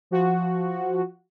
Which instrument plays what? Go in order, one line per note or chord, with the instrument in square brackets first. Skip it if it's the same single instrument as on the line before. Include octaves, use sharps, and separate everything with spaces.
[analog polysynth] F3 F#4